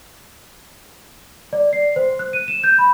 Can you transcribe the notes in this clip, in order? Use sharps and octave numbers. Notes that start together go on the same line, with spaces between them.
D5
C7
C5
F#6
D#7
E7
G6
B5